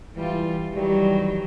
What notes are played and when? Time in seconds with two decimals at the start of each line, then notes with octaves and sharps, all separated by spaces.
0.15 E3 G3 F4
0.74 D#3 E3 F#3 G3